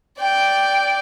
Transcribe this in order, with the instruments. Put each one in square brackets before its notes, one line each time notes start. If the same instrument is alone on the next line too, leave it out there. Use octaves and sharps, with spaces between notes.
[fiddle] D5 G5